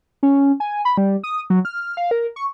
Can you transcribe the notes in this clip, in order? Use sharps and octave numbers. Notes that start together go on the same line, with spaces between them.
C#4
G#5
B5
G3
D#6
F#3
F6
F5
A#4
C#6